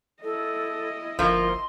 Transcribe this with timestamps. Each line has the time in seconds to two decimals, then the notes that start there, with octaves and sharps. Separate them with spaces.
0.23 E4 A4 D#5
1.19 G1 F3 A#3 C6